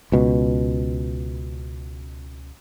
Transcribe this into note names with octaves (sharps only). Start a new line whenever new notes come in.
C#2 B2